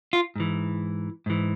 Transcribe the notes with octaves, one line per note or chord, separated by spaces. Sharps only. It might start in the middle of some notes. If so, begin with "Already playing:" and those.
F4
G#2 E3
G#2 E3